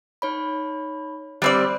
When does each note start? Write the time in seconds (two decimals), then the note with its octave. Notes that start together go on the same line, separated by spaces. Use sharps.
0.22 D#4 C#5 B5
1.42 G3 C4 D5 B5 F#6